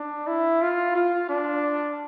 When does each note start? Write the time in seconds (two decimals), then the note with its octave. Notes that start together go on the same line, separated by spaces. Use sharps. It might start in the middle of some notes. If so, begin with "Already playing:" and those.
Already playing: D4
0.27 E4
0.61 F4
0.96 F4
1.30 D4